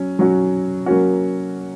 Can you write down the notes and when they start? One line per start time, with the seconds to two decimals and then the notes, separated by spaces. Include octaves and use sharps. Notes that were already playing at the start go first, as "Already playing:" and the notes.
Already playing: F#3 C#4
0.19 F#3 C#4 F#4
0.86 F#3 A#3 C#4 F#4